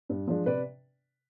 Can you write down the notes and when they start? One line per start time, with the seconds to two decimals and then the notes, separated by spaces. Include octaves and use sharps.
0.09 G2
0.27 F3 G#3 D4
0.46 C3 B4 D5